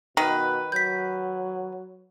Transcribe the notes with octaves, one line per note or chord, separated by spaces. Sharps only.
B2 D#3 B4
F#3 G6 B6